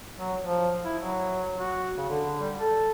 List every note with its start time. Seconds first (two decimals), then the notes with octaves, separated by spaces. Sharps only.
0.18 F#3
0.41 F3
0.85 E4
0.99 F#3
1.57 F#4
1.97 C#3
2.09 D3
2.40 G3
2.58 A4